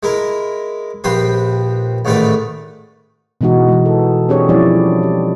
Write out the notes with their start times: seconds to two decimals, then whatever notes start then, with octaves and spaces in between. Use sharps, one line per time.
0.03 G#3 E4 A#4
1.04 A#1 C4 G4 B4 C6
2.05 A1 G#2 D#3 A3 B4 D5
3.41 B2 E3 G#3 D#4 F#4
3.68 E3 G#3
3.86 A4
4.29 C4 D4 G4 G#4 C#5
4.49 F3 G3 C#4 E4 C#5 D5
5.03 G4